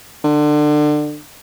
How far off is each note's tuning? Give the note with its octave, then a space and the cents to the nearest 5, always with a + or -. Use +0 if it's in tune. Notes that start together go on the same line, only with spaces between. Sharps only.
D3 +25